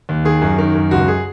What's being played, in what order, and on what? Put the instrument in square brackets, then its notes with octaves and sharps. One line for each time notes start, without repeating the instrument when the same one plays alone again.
[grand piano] D#2
D#3 G#4
F#2
D#3
F#2
C#2 F#4
G#4